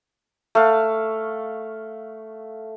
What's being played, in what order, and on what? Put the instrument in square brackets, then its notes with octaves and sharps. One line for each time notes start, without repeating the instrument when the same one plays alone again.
[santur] A3 F5